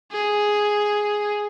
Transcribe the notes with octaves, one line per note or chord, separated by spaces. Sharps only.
G#4